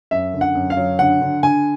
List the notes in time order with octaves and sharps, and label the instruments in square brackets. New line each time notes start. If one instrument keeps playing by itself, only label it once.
[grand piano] F#2 E5
D3
F#5
F#2
F5
F#3
D3 F#5
D3
D3 G#5